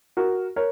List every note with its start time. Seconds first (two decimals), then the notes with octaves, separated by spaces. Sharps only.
0.17 F#4 A#4
0.56 A#4 C#5